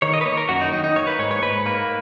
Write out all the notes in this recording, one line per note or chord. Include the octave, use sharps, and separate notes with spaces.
D#3 C#5
D#5
B4
A#3 C#5
A#4
F#2 F#4
D#4
D#3 D#4
D#4
A#3 C#5
B4
G#2 C#5
C#5
G#2 B4
A#3 B4